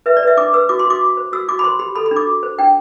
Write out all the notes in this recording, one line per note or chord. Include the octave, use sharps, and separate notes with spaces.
B4 E5
D5
B4 E5
D4 D6
B4 E6
F#4 D6
C6
F#4
D6
F#4
C5
F#4 E6
F#4 D6
B5
C5 C6
G4 B5
A4 B5
B5
D4
D6
F#4
C5
D4 G5